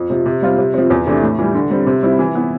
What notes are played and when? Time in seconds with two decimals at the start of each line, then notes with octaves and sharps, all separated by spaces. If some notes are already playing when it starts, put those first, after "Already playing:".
Already playing: F2
0.10 C3 F3
0.26 C3
0.42 G3 C4 F4
0.58 C3
0.74 F3 C4
0.90 E2
1.06 C3 E3 A3 D4
1.22 A2
1.39 E3 G3
1.54 D3
1.71 G3 C4
1.86 C3
2.03 G3 C4 E4
2.19 E3
2.35 B3 E4